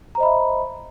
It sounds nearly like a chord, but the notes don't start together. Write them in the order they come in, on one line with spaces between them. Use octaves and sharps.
A#5 C5 D#5 B5 E5